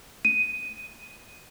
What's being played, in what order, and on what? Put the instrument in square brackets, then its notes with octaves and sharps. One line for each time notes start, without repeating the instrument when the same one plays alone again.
[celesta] D#7